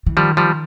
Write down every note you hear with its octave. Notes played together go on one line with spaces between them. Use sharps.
E3
D#3 F3 G3
F3 G3